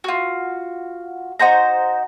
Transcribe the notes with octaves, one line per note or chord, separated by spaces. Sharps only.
F4 F#4
D#4 F#4 C5 A#5